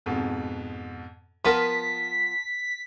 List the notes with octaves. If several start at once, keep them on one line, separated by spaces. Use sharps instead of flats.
F2 G#2 B2
F3 B3 A#4 A5 C6 B6